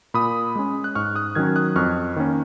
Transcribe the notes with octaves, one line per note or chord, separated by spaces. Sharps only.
A#2 B5 D#6
G#3 C#4
F#6
G#2 C#6 F6
D#6 F#6
D#3 F#3 C#4 F6 G#6
D#6 F#6
F2 C#6 F6
D#3 A#3 C#4